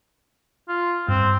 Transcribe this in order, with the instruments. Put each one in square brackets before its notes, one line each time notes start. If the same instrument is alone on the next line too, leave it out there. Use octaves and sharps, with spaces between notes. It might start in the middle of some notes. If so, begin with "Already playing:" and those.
[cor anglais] F4
[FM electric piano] G2 [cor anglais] C4